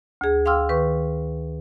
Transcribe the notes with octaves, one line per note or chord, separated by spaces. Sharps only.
D2 G#4
F5 G5 C6 D6 E6 F6
D#3 B4 C#6